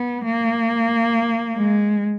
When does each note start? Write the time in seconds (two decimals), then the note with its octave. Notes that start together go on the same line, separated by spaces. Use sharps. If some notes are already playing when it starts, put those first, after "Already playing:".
Already playing: B3
0.25 A#3
1.56 G#3